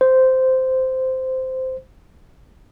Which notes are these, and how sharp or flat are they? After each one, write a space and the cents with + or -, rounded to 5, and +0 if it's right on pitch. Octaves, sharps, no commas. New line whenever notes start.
C5 -10